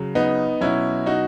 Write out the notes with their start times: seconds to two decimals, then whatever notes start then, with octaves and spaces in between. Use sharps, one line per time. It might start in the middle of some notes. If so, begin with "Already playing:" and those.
Already playing: C#3 F#3
0.15 B3 D#4
0.61 B2 F#3 C#4 E4
1.06 D#4 F#4